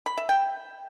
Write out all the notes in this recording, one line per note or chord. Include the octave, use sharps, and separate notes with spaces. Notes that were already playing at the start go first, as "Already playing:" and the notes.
B5
E5
G5